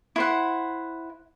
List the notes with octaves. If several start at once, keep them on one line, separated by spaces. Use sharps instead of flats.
E4 C5 F#5